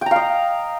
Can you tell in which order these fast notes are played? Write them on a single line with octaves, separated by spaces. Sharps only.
G5 A#5 F5 D#5